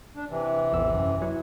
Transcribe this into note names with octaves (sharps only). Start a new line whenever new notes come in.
D4
C3 E3
A1 E2 E6
F#2
F#3 E4